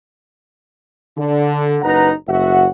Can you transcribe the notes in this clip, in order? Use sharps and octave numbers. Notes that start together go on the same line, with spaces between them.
D3
F#1 D#4 B4 F#5 A#5
F#1 F#4 E5 F#5